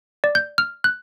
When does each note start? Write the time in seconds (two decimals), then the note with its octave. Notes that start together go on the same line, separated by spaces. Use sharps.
0.24 D5
0.35 G6
0.58 F6
0.84 F#6